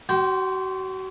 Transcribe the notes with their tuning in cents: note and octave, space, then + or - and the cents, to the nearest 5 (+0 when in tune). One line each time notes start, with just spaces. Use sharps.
F#4 +35 G5 -20 C6 -5